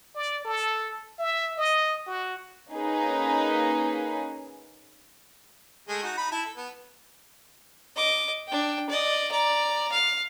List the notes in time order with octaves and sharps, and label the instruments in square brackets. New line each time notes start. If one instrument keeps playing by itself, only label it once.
[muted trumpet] D5
A4
E5
D#5
F#4
[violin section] A#3 C#4 D#4 G#4 B4
[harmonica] G#3 A3 G#4
D#4 F#4
D#4 B5
E4 A5
A4
B3
[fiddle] D#5 D6
D4 G5
D5 D#5
D5 A#5
F5